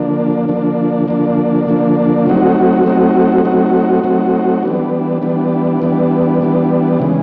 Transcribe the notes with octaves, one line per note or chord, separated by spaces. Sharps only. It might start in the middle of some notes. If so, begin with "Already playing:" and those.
Already playing: D3 F3 A#3 D4
D3 F3 A#3 D4
D3 F3 A#3 D4
D3 F3 A#3 D4
F#3 A3 C4 D#4 F#4
F#3 A3 C4 D#4 F#4
F#3 A3 C4 D#4 F#4
F#3 A3 C4 D#4 F#4
E3 G3 B3 D4
E3 G3 B3 D4
E3 G3 B3 D4
E3 G3 B3 D4
C#3 E3 G#3